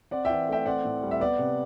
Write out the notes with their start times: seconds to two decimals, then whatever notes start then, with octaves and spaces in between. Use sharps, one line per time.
0.11 C4 D5 F#5
0.25 E3 E5 G5
0.49 A3 E5 G5
0.66 C4 D5 F#5
0.85 A2
1.03 G3
1.11 E5
1.20 B3 D5 F#5
1.39 C3